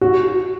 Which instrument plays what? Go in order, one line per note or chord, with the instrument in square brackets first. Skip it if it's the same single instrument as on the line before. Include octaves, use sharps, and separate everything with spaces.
[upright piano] F#4